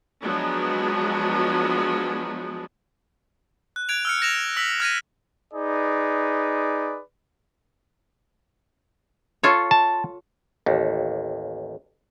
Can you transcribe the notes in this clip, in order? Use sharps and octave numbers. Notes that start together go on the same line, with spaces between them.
F3 F#3 G#3 B3 D4 G#4
F#6
F#6 G#6 D7 F7
E6 F6 C#7
A#6 E7 F7
E6 B6 F#7
F6 G#6 A#6 D#7
D#4 G#4 B4 D5
F4 A4 C#5
A5
A1 D#2